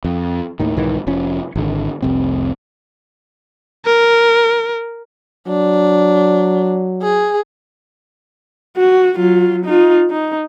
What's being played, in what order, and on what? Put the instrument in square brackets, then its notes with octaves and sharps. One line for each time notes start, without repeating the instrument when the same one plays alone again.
[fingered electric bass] F2
D#2 A2 D#3
B1 G#2 D#3 E3
F1 F3 C#4
G#1 D3
F1 C2 C4
[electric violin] A#4
[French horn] F#3 [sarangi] D4
[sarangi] G#4
[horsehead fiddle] F#4
F#3 F4
D#4 F4
D#4